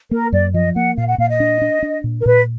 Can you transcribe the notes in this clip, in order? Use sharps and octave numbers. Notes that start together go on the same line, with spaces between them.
A#3 A#4
F#2 D5
F3 D#5
A#3 F#5
A#2 F5
F#5
A#2 F5
D#5
D4
D4
D4
A#2
A#4
A#2 B4